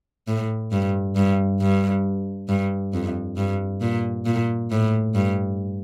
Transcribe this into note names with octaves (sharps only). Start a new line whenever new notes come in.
A2
G2
G2
G2
G2
F2
G2
A#2
A#2
A2
G2